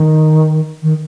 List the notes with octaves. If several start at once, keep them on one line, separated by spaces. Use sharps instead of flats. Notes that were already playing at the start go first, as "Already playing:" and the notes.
Already playing: D#3
D#3